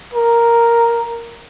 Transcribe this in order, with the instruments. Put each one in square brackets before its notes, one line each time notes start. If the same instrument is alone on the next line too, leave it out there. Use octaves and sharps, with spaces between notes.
[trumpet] A#4